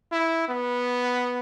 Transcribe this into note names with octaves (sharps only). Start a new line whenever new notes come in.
E4
B3